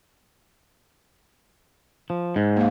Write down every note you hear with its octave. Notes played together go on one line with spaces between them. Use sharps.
F3
G#2
A#3 F5